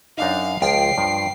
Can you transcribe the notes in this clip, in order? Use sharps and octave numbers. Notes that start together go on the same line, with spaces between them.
F#2 D4 D#4 F5
C#2 F3 G5 C7
G2 F3